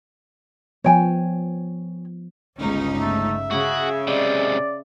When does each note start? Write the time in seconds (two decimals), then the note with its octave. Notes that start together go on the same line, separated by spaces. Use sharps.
0.84 F3 B3 C#5 G5 G#5
2.58 G1 C#2 C#4 D#4
3.00 A3 E5
3.51 C#3 F#4 G#4
4.08 C3 G#3 D5